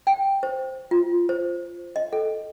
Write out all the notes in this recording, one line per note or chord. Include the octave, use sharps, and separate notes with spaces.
G5
C5
F4
C5
D#5
A4